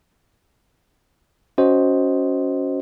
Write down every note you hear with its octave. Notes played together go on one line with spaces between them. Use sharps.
C#4 F#4 C5 D#5